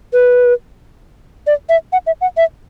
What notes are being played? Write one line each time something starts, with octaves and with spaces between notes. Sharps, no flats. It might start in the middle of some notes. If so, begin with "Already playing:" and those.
B4
D5
E5
F#5
E5
F#5
E5